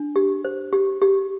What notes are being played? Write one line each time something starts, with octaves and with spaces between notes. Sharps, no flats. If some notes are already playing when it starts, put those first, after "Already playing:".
Already playing: D4
G4
C5
G4
G4